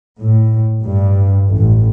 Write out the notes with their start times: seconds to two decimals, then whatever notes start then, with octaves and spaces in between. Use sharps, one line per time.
0.21 A2
0.80 G2
1.56 A1